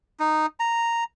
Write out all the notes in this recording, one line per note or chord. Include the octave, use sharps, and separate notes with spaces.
D#4
A#5